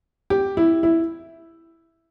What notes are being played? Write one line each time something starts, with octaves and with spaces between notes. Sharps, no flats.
G4
E4
E4